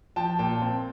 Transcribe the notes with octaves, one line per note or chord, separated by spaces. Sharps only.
F3 G5 A5
A#2 G5 A5
C4